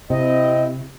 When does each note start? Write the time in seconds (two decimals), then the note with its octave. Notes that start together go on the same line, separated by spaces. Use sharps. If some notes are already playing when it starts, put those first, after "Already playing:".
0.10 C3 C4 E4 D#5